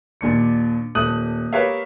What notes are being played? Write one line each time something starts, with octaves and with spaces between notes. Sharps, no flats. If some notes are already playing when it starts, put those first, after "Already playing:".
D#2 A#2 D4 C#7
D#1 A3 E5 D#6 F#6 F#7
G4 A#4 B4 C#5 E5 F5